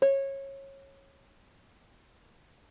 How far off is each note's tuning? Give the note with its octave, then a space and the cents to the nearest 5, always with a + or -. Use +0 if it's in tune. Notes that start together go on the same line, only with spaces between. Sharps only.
C#5 -20